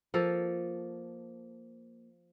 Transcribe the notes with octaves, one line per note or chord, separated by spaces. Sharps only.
F3 A#3 A4